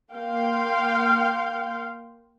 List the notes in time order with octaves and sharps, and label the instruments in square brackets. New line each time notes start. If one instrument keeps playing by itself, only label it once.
[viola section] A#3 F5 G5 C6